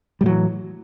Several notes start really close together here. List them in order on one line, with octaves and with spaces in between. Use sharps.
G3 A2 F#3 E3